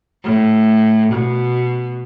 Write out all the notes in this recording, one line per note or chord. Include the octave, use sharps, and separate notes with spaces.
A2
B2